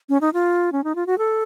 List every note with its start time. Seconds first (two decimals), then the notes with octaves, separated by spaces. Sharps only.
0.09 C#4
0.21 D#4
0.33 F4
0.72 C#4
0.84 D#4
0.95 F4
1.06 F#4
1.18 A4